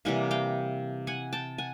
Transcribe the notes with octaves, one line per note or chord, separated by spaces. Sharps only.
C3 E3 G3 A#3 F#5 G#5
F5 G5
F#5 G#5
G5 A5
F#5 G#5